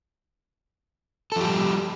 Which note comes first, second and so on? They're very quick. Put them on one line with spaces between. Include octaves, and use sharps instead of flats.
A4 F3 G4 G3